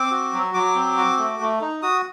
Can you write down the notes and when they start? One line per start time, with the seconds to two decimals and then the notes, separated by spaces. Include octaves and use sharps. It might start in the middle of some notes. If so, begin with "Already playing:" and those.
Already playing: C4 D6
0.11 F#4
0.33 F#3
0.54 F#3 D6
0.76 C4
0.97 F#4
1.18 A3
1.40 A3
1.61 D#4
1.82 F#4 D#6